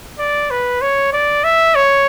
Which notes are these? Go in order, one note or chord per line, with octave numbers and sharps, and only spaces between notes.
D5
B4
C#5
D5
E5
C#5